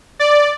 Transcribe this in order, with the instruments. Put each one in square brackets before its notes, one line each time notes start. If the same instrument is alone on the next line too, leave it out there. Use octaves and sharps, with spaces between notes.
[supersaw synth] D5